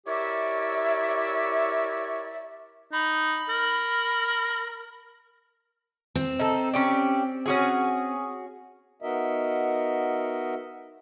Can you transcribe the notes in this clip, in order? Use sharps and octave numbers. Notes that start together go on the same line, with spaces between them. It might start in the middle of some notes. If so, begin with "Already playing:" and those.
E4 G4 A#4 C#5 D5 E5
D#4 B5
A#4
C4
D#4 A4
C#4 G4 D5
C#4 F#4 G#4
B3 D#4 F#4 A#4 D#5 E5